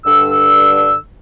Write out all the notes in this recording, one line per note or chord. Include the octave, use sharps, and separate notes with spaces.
G2 D3 E6